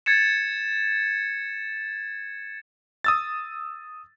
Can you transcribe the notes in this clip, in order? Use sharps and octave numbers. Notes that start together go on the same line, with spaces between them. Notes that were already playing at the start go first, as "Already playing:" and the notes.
G#6 A6 C#7 E7
D#6 E6 A6